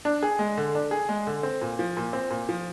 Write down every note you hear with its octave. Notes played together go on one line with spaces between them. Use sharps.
D4
G#4
G#3
D3
D4
G#4
G#3
D3
C4
A#2
F3
A#2
C4
A#2
F3